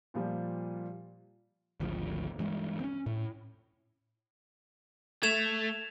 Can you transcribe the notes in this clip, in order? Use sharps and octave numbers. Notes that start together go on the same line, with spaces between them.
A#2 F3 G3
G#1 D2 F3
G2 E3 G#3
C4 C#4
A2
A3 G#6 E7 F7